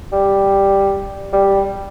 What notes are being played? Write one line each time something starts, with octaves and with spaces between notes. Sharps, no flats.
G3
G3